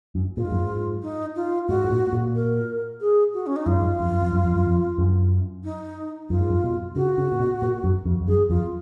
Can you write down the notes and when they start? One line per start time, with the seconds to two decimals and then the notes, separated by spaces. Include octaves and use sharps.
0.15 F#2
0.37 A#2 F4
0.44 G#2
0.51 F#2
0.59 G#2
1.03 D#4
1.36 F4
1.69 G#2 F#4
1.84 G#2
1.91 A#2
2.13 A#2
2.35 A#4
3.01 G#4
3.34 F#4
3.47 C#4
3.56 D#4
3.66 F#2 F4
3.74 G#2
3.82 F#2
4.00 F2
4.11 F#2
4.22 F2
4.33 F#2
4.44 F2
4.55 F#2
4.66 F2
4.98 F#2
5.64 D#4
6.30 F#2 F4
6.39 G#2
6.49 F#2
6.64 B2
6.96 C#3 F#4
7.18 C#3
7.32 A#2
7.40 B2
7.62 A#2
7.84 F#2
8.06 F2
8.21 F2
8.28 F#2 G#4
8.50 F2 F4